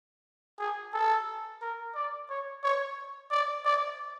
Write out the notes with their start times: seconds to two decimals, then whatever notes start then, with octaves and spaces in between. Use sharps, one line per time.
0.59 G#4
0.94 A4
1.62 A#4
1.95 D5
2.29 C#5
2.63 C#5
3.31 D5
3.65 D5